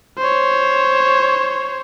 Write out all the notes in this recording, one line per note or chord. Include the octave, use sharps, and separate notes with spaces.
C5 C#5